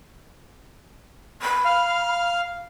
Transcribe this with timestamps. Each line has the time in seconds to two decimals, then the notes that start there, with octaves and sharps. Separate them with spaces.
1.41 B5
1.65 F5 F6